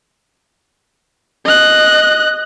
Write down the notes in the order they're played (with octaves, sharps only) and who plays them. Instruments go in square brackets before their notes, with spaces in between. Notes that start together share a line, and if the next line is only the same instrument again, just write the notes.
[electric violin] D#5 F#6